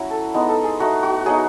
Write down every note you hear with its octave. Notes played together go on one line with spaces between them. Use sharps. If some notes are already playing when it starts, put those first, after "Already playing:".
Already playing: F#3 C#4 E4 F#4 F#5
A4
G#3 B3 D#4
A4
G#4
A3 D#4 F#4
F#4
F#3 B3 D#4 G#4